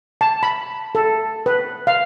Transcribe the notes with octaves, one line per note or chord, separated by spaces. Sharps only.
A5
B5
A4
B4
F5